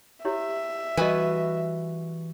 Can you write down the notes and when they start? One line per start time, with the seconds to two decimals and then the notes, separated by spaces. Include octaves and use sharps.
0.25 E4 G4 C#5 E5
0.97 E3 G3 F#4 A4 B4 D#5 G#5